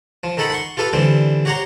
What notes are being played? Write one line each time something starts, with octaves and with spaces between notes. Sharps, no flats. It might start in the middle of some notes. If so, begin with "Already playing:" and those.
F3
D#3 D#4 A4 F#5 B5
F#5 C6 C#6
F4 G4 A4 B4 F5
D3 E3 G3 C4
F#4 G4 C#5 F#5 A#5 C6